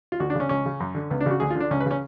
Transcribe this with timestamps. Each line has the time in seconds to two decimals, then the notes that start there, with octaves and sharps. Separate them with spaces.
0.12 F4
0.20 D2 F#4
0.30 D4
0.35 C#3 C#4
0.49 C#2 C#4
0.66 C#3
0.80 F#2
0.95 D3
1.10 C#2 B3
1.21 D4
1.26 C#3 F#4
1.40 D2 G#4
1.50 F4
1.55 D3 D4
1.71 C#2 C#4
1.80 B4
1.86 C#3 C#4